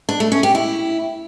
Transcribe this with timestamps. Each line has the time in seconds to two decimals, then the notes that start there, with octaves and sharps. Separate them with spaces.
0.09 D4
0.20 A3
0.32 C#4
0.43 G4
0.55 E4